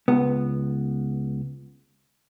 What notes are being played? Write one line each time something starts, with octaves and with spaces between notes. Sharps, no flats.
C#2 B3